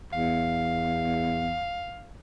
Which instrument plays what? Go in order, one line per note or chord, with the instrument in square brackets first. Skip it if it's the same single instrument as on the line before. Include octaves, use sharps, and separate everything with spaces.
[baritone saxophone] E2 [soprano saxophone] F5